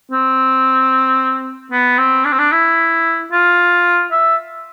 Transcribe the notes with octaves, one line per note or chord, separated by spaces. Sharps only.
C4
B3
C4
D4
C4
D4
E4
F4
E5